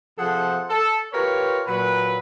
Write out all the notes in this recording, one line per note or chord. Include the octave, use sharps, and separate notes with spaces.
C3 F3 G#4 A4 C5 F#5
A4
F4 G4 A#4 B4 C#5
A#2 F#3 B4